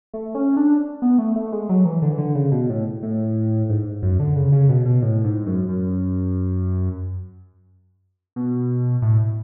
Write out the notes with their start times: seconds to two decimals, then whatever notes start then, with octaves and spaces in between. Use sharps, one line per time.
0.13 A3
0.35 C#4
0.57 D4
1.02 B3
1.18 A3
1.36 A3
1.52 G#3
1.69 F#3
1.85 E3
2.02 D3
2.12 E3
2.18 D3
2.35 C#3
2.52 B2
2.69 A2
3.03 A2
3.69 G#2
4.02 F#2
4.19 D3
4.36 C#3
4.52 C#3
4.69 B2
4.85 B2
5.02 A2
5.24 G#2
5.46 F#2
5.69 F#2
8.36 B2
9.02 A2